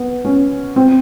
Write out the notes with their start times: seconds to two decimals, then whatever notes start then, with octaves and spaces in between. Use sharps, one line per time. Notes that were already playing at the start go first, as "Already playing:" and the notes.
Already playing: B3
0.25 C#4
0.76 C4